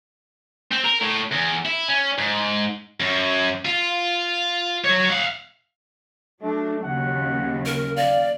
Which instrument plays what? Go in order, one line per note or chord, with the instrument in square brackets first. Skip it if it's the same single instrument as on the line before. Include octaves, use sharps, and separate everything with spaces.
[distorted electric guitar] C4
A#4
A2
E2
E4
C#4
G#2
F#2
F4
F#3 C#5
F5 F#5
[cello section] F#3 D4 [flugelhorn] A3
[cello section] D#2 C#3 F#3 [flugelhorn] F#5
[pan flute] A#4
[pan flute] D5 [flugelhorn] F5